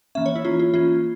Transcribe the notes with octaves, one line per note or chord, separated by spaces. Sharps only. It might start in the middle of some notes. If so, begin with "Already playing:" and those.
E3 A#3 C#4 E5
C#5
E4
E3 A#3 C#4 F4
F4
E3 A#3 C#4 F4